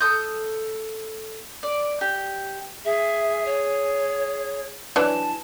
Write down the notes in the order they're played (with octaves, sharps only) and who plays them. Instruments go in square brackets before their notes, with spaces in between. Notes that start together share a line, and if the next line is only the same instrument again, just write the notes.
[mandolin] A4 D#6 G6
D5
G4
[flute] G#4 [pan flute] E5
[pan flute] C#5
[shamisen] E3 F#3 D4 [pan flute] A5